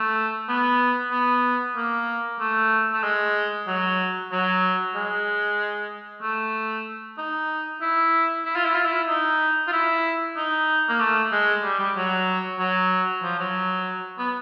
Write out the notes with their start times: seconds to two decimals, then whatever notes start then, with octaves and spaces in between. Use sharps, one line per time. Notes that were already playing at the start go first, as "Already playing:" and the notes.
Already playing: A3
0.49 B3
1.12 B3
1.76 A#3
2.40 A3
2.92 A3
3.03 G#3
3.67 F#3
4.31 F#3
4.95 G#3
6.22 A3
7.18 D#4
7.82 E4
8.45 E4
8.56 F4
8.65 E4
8.75 F4
8.86 E4
9.08 D#4
9.67 F4
9.72 E4
10.37 D#4
10.89 A#3
11.00 A3
11.32 G#3
11.63 G3
11.79 G3
11.96 F#3
12.59 F#3
13.23 F3
13.39 F#3
14.18 B3